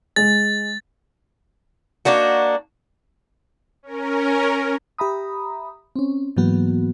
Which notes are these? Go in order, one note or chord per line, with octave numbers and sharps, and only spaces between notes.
G#3 A6
A#3 D4 D#4 F#4
C#4 A#4
G4 E5 A#5 B5 D#6
C4 C#4
G#2 E3 F#3 A#3 B3 F#4